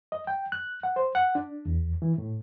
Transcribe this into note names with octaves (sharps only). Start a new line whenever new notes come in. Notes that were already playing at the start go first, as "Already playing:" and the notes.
D#5
G5
F#6
F#5
C5
F#5
D4
E2
E3
A2